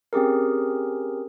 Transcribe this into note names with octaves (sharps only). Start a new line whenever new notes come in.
C4 C#4 G4 G#4 A#4